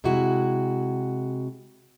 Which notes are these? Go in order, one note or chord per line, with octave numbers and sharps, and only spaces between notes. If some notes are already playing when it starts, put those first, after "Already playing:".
C3 G#3 E4 F#4